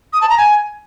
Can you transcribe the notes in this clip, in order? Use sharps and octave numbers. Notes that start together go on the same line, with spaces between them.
D#6
A5
A#5
G#5